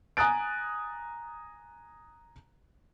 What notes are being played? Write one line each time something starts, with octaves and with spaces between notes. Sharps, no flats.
G#5 A#5 D#6 F#6 A6 D7